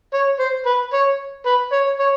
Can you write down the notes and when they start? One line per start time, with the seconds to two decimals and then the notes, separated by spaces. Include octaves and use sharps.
0.13 C#5
0.39 C5
0.66 B4
0.93 C#5
1.46 B4
1.72 C#5
1.99 C#5